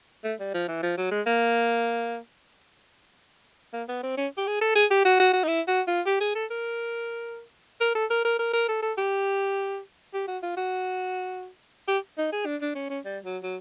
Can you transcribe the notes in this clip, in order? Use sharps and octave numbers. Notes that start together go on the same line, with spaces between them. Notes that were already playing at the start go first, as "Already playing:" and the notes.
A3
G3
F3
E3
F3
F#3
G#3
A#3
A#3
B3
C4
C#4
G4
G#4
A4
G#4
G4
F#4
F#4
F#4
D#4
E4
F#4
F4
G4
G#4
A4
A#4
A#4
A4
A#4
A#4
A#4
A#4
A4
A4
G4
G4
F#4
F4
F#4
G4
D#4
G#4
D4
D4
C#4
C#4
G3
F#3
F#3